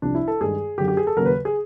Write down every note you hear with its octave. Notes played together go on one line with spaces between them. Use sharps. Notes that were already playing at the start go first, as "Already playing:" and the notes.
C2 C3 F3 D4
E4
A4
G2 D#3 G#3 G#4
F#2 D3 F#3 G4
G4
G#4
A4
D#2 C#3 F#3 A#4
B4
G#4